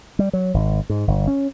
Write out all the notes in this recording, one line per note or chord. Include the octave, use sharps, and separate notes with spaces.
G3
F#3
G#1
G#2
G1
C#4